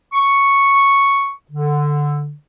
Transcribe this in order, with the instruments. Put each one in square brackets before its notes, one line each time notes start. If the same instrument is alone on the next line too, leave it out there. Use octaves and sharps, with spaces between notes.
[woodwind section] C#6
D3